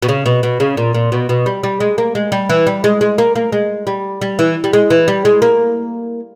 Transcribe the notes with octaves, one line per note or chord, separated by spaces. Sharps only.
B2
C#3
B2
B2
C#3
A#2
A#2
B2
B2
G3
G3
G#3
A#3
G#3
G3
E3
G3
G#3
G#3
A#3
A#3
G#3
G3
G3
E3
G3
G#3
E3
G3
G#3
A#3